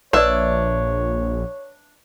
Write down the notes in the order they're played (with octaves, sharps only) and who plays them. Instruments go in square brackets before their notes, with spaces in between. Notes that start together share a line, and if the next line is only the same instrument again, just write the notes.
[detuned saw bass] A#1 [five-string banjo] D4 E5 [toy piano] B4 D5 [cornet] C#5